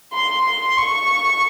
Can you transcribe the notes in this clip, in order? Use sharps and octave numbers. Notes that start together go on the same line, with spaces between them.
C6
C6
C#6